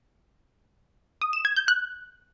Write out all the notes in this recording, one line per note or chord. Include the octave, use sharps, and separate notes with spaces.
D#6
E7
G#6
G6
F#6